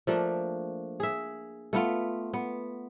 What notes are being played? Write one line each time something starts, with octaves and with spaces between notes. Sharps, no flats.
F3 A3 A#3 D4
G#4 E5
A3 B3 F4
B3